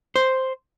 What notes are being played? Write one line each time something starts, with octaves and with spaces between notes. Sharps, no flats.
C5